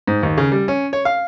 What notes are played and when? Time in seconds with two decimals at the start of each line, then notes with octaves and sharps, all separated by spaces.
0.07 G#2
0.23 D#2
0.37 C#3
0.52 G3
0.68 C#4
0.93 C#5
1.05 F5